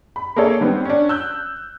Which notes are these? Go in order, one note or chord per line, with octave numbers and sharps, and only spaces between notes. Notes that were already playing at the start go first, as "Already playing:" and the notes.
B5
A#3 G#4 A4 C#5
D#3 G3 B3 C4
C#4 D4
E6 F#6 G6